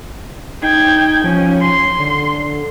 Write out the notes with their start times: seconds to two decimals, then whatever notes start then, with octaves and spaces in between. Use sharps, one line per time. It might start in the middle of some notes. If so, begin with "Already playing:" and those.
0.63 D#4 G5 G#6
1.24 F3 C#4
1.62 C6
1.99 D3